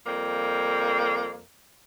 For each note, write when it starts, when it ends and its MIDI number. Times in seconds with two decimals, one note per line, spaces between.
0.06 1.43 41
0.06 1.43 55
0.06 1.43 58